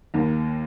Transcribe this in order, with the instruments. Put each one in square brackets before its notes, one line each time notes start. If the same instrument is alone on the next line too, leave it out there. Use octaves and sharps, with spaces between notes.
[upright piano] D#2 D#3 A#3